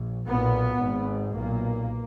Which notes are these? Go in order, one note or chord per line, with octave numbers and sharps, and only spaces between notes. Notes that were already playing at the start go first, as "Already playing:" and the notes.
Already playing: A#1
B1 A#2 B3
G#1 G#2
B1 A#2 A#3